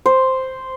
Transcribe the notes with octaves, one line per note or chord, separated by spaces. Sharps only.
C5